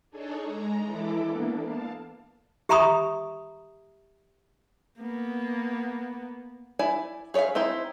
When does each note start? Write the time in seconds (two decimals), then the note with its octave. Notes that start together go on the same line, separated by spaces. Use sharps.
0.10 D4 D#4 G#4 A4 C#5
0.44 G#3 A#5
0.83 E3 E4 A4 D6
1.24 A#3 B3 D4
1.58 F5 A5
2.69 G4 E5 A#5 B5 C#6 D#6
4.99 A#3 B3
6.79 E4 D5 G#5
7.34 G#4 C#5 D5 E5 F5
7.55 C4 D#4 E4 C5